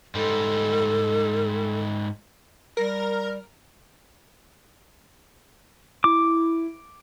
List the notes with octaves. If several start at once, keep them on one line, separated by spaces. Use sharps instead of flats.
G#2 G3 A4
G3 A#4
E4 D6